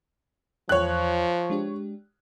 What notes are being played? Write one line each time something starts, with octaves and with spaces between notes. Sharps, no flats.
E2 F3 F4 C#5 G5 F#6
G#3 D4 G4